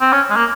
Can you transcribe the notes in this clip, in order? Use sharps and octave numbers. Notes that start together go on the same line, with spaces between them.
C4
C#4
G#3
A#3